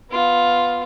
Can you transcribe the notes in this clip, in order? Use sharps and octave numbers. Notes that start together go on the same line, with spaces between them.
B3 F4